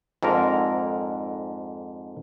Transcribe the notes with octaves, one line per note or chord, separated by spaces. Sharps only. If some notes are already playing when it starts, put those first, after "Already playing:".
F2 G#2 D3 A#4